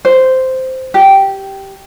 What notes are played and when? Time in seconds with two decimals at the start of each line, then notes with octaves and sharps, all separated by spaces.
0.05 C5
0.94 G4